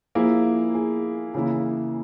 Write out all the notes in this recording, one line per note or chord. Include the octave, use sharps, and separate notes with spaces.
F3 A#3 E4 G#4
G#4
C#3 E3 A#3 E4 G#4